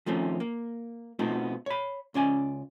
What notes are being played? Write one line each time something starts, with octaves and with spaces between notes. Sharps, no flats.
D#3 F3 A3 C4 C#4
A#3
B2 A3 B3 C4 D#4 F4
C#5 B5
C#2 C#4 D5 G#5